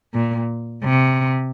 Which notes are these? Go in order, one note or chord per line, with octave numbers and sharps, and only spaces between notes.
A#2
C3